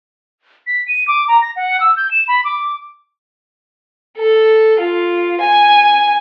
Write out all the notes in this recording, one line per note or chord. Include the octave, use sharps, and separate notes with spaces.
B6
D#7
D6
A#5
A#6
F#5
E6
G6
E7
B5
D6
A4
F4
G#5